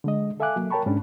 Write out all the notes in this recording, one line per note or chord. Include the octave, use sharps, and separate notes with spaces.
D3 G#3 D#5
A4 E5 F5 G#5 D6 F#6
F#3 A#3
A#4 C#5 G5 A5 B5 C#6
G#2 C#4 D4